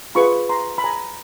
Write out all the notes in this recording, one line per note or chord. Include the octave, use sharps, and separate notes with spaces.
F4 G#4 B4 B5 C#6
A#5 C6
B5
G#5 A#5